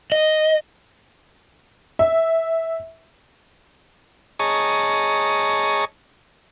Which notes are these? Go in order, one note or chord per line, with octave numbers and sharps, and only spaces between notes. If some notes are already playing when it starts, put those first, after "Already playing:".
D#5
E5
G#4 C#5 D#5 A5 A#5 C#6